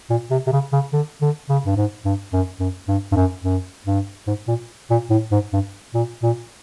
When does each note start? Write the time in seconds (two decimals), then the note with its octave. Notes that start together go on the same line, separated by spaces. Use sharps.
0.10 A#2
0.31 C3
0.47 C3
0.52 C#3
0.73 C#3
0.93 D3
1.22 D3
1.49 C#3
1.66 G2
1.77 G#2
2.05 G2
2.33 F#2
2.60 F#2
2.88 G2
3.12 G2
3.16 F#2
3.44 F#2
3.86 G2
4.27 G#2
4.48 A#2
4.90 A#2
5.10 A2
5.32 G#2
5.53 G2
5.94 A#2
6.23 A#2